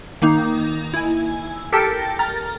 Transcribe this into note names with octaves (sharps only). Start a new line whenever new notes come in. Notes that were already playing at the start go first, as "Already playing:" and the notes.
D#3 A#3 D#4
E4 G#5
G4 A4 A#4 G5 A5
A#5 F6 A6